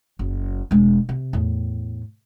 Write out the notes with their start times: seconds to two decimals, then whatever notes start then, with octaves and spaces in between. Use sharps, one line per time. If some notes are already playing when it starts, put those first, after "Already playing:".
0.19 F#1
0.71 E1 G#3
1.09 C3
1.33 E2 A2